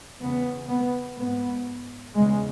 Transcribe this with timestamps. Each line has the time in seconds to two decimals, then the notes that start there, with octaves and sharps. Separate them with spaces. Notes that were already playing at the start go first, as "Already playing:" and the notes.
0.20 E2 C#3 B3
0.68 B3
1.17 G#2 B3
2.15 E2 C#3 G#3